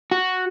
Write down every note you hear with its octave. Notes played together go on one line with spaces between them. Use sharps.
F#4